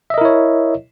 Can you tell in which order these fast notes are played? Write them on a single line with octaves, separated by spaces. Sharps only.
E5 D#5 A#4 E4 C#5